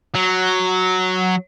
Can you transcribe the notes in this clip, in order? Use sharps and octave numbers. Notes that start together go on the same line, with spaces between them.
F#3